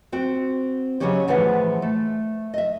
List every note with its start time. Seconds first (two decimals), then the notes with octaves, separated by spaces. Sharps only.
0.12 C4 F#4 G5
1.00 C#3 E3 F#3 G#3 C#4 G4
1.28 A2 E3 F3 G#4 B4 F#5
1.82 A3
2.54 D#5 E5